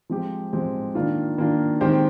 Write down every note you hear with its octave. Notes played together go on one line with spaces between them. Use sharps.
F3 G#3 C4 G4
F3 G#3 C4 G4
D#3 A#3 D4 F4
D#3 A#3 D4 F4
D#3 G#3 C4 G4 C5